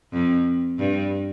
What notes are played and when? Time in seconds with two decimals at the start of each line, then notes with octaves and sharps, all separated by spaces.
0.13 F2
0.79 G2